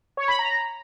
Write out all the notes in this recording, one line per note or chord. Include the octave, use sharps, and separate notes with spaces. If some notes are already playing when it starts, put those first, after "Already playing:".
C#5
B5
A#5